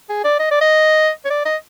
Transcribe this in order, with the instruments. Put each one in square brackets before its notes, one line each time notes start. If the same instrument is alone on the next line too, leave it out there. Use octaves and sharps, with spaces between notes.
[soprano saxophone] G#4
D5
D#5
D5
D#5
C#5
D5
D#5